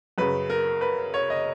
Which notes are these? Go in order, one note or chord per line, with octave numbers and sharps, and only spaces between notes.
F#2 C#3 B4
A#4
B4
C#5
D#5